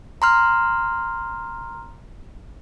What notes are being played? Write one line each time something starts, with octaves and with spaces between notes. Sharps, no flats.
A#5 C6 F6